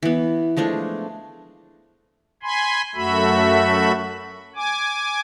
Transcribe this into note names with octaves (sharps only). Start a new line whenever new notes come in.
E3 B3
F3 G#3 A3 D4
G#5 B5 C6
F#2 A3 F#4 E5 B5
G#5 D6